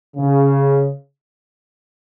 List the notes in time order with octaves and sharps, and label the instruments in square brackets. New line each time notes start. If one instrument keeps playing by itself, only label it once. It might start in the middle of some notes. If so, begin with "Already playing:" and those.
[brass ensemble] C#3